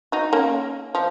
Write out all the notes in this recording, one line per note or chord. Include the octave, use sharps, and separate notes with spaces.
D#4 F#4
A#3 C#4
F3